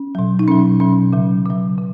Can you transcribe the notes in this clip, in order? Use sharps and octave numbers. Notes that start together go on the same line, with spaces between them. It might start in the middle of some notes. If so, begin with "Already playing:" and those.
Already playing: C#4
B2 F#3
D#4
B2 F#3 C#4
B2 F#3 C#4
C#3 F#3
C#3 F#3
C#3